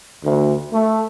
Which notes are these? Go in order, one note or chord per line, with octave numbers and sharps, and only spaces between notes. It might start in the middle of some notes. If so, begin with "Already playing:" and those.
D2
A3